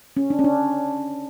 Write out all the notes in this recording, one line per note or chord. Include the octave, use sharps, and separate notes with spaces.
C#4
D4
C#4
D4